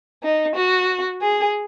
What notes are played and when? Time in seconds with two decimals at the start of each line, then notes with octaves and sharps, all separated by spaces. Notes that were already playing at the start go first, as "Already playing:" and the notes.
0.23 D#4
0.56 F#4
1.22 G#4